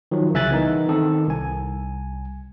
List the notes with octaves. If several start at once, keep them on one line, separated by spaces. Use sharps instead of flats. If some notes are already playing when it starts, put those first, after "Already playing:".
D#3 F3 F#3
C2 C#3 E5 G#5 F#6 A6
E3 B3 D#4 A#4
D#3 C4 A4
C2 G#5